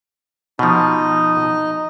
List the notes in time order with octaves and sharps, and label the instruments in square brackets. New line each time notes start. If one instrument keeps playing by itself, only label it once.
[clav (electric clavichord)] B2 F3 [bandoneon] D#4 D#5